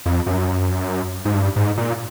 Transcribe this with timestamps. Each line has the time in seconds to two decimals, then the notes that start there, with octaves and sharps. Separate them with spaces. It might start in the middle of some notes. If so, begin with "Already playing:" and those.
0.06 F2
0.26 F#2
1.25 G#2
1.34 G2
1.56 G#2
1.78 A#2